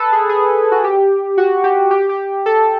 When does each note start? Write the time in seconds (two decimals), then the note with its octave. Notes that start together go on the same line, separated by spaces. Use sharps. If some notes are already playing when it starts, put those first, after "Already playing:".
Already playing: A4 B4
0.12 G#4
0.29 G#4
0.71 F#4
0.84 G4
1.37 F#4
1.64 G4
1.91 G4
2.09 G4
2.46 A4